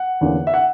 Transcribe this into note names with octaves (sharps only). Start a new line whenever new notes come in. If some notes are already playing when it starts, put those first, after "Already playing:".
Already playing: F#5
E2 D3 A#3 C#4
E5
F#5